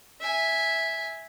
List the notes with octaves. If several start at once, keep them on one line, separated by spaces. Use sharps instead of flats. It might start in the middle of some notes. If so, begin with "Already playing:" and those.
E5 G#5